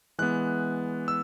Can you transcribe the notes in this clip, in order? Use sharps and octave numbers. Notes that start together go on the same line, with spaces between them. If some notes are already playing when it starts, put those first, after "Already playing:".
E3 G#3 B3 F#6
E6